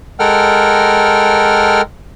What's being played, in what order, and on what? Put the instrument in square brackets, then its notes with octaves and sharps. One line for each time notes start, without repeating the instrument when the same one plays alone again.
[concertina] G#3 A4 A#4 F#5 G5 F6